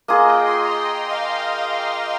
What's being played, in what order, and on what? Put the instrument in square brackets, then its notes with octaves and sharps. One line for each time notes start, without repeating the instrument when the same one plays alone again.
[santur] A#3 F4 G#4 [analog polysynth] D#5
[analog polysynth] G5
C6
A#5
G5
F5
D#5